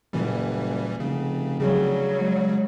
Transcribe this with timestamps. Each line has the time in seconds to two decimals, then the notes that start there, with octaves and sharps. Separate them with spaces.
0.13 F#1 A#2 E3 G3
1.00 F1 C#3
1.61 C#3 F#3 G3 G#4
2.21 G#3